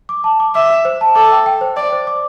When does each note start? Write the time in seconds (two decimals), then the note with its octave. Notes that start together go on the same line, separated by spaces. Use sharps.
0.09 D6
0.24 A5
0.40 D6
0.55 E5 D6
0.70 D6
0.85 C5
1.01 A5
1.15 A4 D6
1.32 G5
1.46 G5
1.61 C5
1.77 D5 D6
1.92 C5
2.07 D6